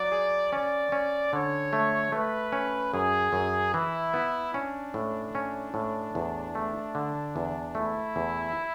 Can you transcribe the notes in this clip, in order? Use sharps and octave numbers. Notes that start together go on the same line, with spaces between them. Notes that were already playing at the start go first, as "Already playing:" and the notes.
Already playing: F#3 D5
G#4
C#4 D5
C#4
D3 C#5
A3
A3 B4
C#4
F#2 G#4
F#2
E3 E4
B3
C#4 D4
A2
C#4
A2
E2
A3
D3
E2
A3 E4
E2